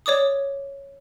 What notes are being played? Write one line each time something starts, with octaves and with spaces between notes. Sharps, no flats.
C#5 D5 D6 D#6